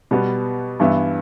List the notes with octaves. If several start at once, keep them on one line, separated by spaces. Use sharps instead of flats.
B2 G3 B3 F#4
G2 E3 B3 E4